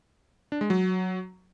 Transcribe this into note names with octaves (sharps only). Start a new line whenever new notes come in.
D4
G#3
F#3